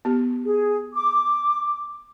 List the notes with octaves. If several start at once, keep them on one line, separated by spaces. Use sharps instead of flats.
B3 G4
G#4
D6